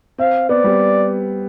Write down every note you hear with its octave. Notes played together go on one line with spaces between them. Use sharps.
C4 F5
B3 D5
G3